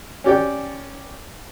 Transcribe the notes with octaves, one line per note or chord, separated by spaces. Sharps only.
C#4 G4 D5 G5